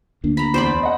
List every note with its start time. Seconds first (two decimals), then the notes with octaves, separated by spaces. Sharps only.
0.24 D2 A#3 D4
0.37 A#5 B5
0.54 E2 C5 D5 B5
0.83 D#5 F#5